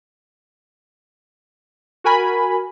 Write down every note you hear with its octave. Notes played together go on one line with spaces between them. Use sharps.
F#4 A#4 G#5 B5